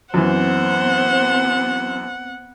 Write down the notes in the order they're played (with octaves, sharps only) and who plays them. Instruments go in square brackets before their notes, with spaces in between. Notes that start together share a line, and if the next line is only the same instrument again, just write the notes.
[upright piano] F#2 E3 [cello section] B3 C4 [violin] C5 [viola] F#5